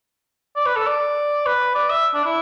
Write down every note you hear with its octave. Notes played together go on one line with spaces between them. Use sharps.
D5
B4
A4
D5
B4
D5
E5
D4
E4